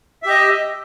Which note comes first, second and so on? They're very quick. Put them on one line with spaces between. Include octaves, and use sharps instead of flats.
E5 G4 D#5